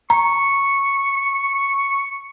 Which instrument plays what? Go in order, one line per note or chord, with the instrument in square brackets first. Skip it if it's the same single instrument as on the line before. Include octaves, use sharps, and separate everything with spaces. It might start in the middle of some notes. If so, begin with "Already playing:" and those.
[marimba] A#5 [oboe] C#6